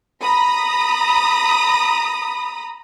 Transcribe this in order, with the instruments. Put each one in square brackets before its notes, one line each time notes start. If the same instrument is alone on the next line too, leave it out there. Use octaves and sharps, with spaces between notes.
[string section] A#5 B5 D#6